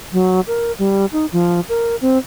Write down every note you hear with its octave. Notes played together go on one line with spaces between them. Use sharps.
F#3
A#4
G3
D#4
F3
A#4
C4